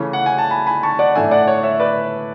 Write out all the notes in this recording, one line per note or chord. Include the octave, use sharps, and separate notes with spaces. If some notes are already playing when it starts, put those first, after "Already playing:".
Already playing: C#3 E3 A3 C#4
F#5
G#5
A5
G#5 B5
G#5 B5
A5 C#6
D5 F#5
A2 E3 A3 D4 E5 G#5
D5 F#5
C#5
C#5 E5
B4 D5